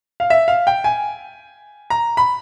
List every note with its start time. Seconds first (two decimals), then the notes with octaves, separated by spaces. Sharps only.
0.20 F5
0.30 E5
0.48 F5
0.67 G5
0.84 G#5
1.90 A#5
2.17 B5